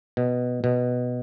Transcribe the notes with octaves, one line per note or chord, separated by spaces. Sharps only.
B2
B2